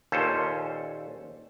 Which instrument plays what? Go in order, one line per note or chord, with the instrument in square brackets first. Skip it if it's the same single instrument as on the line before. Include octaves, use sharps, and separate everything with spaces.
[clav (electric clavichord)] D#2 A#2 C#4 A4 C5